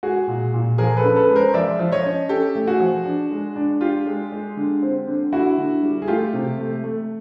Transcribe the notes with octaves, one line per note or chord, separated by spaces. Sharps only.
G#3 F#4 G#4
A#2
A#2
F3 G#4 A#4
A4 B4
C#4
A4 B4
G#3
A#4 C5
F3 D5 E5
F3
C#5 D#5
C#4
C#4 G4 A4
A3
F#4 G#4
F3
D4
G#3
D4
D4 F4 G4
G#3
G#3
D3
C4
D3
D3 E4 F#4
D3
G3
G#4
A3 F4 G4
C3
A3
A3